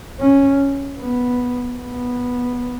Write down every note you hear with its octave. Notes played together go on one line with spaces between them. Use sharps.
C#4
B3
B3